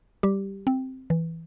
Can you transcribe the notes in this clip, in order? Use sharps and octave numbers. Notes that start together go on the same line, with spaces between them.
G3 G4
C4
E3